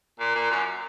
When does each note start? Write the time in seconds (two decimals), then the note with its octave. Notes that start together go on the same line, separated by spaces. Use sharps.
0.20 A#2
0.35 A#2
0.50 F#2